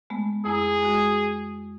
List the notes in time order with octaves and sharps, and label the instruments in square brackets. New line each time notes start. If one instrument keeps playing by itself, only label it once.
[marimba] G#3 A3 B3
[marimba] F2 E4 A#5 [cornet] G#4
[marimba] G#3 F#4